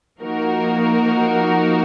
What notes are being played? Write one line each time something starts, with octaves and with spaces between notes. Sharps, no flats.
F3 A#3 D#4 F#4 A#4